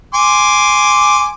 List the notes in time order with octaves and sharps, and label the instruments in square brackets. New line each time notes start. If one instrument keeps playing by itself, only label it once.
[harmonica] G#5 C6 D6